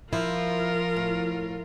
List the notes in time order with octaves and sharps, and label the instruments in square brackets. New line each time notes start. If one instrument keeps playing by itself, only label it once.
[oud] F3 [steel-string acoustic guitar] E4 [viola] F4 A#4
[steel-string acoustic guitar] A2